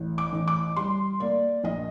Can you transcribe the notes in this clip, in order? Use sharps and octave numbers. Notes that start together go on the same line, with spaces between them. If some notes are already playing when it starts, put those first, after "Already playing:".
Already playing: A1
D6
A1
D6
G3 C6
A#3 D5
A#1 D#5